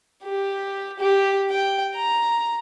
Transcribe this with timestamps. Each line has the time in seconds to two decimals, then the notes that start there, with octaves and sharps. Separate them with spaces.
0.24 G4
0.99 G4
1.50 G5
1.95 A#5